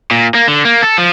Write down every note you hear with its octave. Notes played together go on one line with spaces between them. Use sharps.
A#2
A#3
D3
A#3
A4
F3